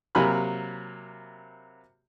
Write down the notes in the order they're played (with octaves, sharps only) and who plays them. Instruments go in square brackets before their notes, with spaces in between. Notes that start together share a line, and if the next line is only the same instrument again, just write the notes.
[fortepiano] C3 F#3 A#3 G#5 B5 F6